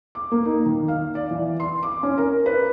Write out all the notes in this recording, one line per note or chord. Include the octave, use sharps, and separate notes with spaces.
D6
A#3
D#4
D#3
F5
D5
E3
C6
D6
C#4
A#4
B4